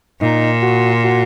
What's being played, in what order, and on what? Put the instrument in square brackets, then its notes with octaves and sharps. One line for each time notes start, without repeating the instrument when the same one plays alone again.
[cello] A#2 [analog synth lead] D#4
[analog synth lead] F#4
F#4